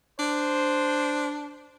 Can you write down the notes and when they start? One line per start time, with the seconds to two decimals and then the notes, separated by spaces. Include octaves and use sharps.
0.19 D4 C5